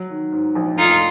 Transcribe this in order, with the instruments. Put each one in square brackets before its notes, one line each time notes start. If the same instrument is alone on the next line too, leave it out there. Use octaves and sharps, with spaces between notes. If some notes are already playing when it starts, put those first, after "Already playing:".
Already playing: [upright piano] F#3
D#3
G#2
A#1
[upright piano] F1 [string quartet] D#4 F4